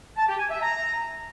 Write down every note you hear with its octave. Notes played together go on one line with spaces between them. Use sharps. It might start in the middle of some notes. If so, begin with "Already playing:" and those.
A5
G4
G#5
E5
A#5